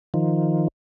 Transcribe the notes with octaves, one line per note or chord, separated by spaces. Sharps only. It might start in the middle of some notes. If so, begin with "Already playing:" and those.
D#3 F3